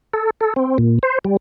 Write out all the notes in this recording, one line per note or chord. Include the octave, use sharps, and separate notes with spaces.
A4
A4
C4
A#2
C5
G3